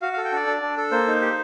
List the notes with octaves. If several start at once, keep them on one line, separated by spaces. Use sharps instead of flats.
F#4 F5
F5
A4
G5
D4 D5
D4
D4
A4
A#3 C5
D#4
G4